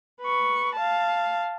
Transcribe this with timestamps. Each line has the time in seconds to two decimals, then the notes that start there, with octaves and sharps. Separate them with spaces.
0.21 B4 C#6
0.75 F5 A5